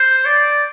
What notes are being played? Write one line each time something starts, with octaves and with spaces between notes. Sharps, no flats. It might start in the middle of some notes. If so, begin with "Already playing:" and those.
Already playing: C5
D5